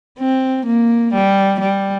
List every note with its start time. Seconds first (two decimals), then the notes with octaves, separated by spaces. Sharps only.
0.19 C4
0.66 A#3
1.13 G3
1.60 G3